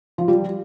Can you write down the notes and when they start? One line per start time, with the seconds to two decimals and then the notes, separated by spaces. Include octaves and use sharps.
0.18 F3
0.28 G3